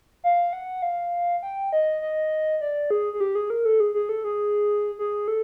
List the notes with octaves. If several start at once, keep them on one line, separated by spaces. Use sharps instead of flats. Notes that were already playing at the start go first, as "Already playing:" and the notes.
F5
F#5
F5
G5
D#5
D#5
D5
G#4
G#4
G4
G#4
A#4
A4
G#4
G#4
A4
G#4
G#4
A4